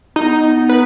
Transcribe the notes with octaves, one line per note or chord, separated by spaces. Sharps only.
B3 D#4
B4